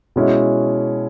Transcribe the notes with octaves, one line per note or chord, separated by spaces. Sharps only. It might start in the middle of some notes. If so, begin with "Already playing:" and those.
B2 G#3 C#4 E4